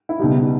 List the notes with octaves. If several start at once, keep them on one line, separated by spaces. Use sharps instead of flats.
E4
C#2 B2 G3 D#4